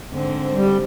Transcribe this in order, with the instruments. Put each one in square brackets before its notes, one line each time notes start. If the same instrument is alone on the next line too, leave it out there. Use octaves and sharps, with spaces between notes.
[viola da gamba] G#2 D3 C4
[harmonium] G3